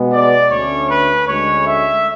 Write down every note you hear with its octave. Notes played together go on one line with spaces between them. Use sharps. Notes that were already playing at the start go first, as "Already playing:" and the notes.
Already playing: B2 G#3 B3
D5
D2 D3 A3 C#4 C#5
B4
D2 D3 G#3 C#4 C#5
E5